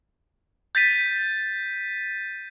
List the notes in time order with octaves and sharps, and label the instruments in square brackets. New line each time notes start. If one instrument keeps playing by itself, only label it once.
[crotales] G6 A6 B6 D#7